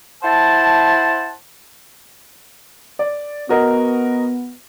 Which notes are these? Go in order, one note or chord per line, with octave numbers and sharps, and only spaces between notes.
E4 C5 F#5 A5
D5
B3 F#4 A#4 D#5